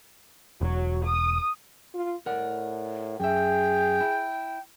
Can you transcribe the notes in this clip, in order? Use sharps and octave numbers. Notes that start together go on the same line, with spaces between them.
E1 F#3
D#6
F4
A2 A#4 D5 F#5
F#2 G#4 E5 G5
E4